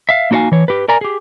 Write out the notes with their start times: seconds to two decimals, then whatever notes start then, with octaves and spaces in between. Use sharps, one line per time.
0.09 E5 F5
0.31 A#3 D#4 F#4 C#5 F5 G#5
0.52 E3 C#5
0.68 G4 B4
0.88 A#4 D5 G#5 A#5
1.01 G4 G#4